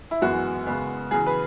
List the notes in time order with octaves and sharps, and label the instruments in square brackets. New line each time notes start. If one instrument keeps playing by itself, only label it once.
[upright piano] E4
F#2 E3 G#3 B3 F#4
C#3 G#3 B3
E2 C#3 F#3 G#4
B4